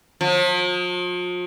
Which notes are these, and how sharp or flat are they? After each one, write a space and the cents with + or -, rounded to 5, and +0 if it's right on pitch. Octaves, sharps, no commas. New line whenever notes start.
F3 +40